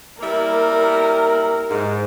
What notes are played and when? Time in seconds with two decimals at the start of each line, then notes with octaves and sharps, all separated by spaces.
0.21 G3 A#3 E4 A#4
1.71 G#2